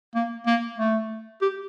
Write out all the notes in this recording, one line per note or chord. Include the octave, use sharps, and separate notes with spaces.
A#3
A#3
A3
G4